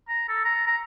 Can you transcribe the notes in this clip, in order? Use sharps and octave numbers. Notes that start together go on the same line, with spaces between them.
A#5
A4
A#5
A#5